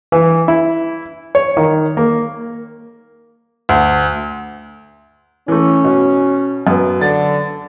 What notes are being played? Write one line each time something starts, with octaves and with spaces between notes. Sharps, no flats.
E3
E4
C#5
D#3
A#3
D2
E3 A3 C#4
B2
F#2 B3
D3 A6